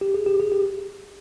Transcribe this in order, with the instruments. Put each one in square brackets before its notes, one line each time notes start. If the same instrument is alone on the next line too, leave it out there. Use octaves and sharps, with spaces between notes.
[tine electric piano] G4
G#4
G4
G#4
G4